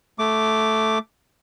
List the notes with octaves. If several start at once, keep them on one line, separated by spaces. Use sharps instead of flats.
A3 D6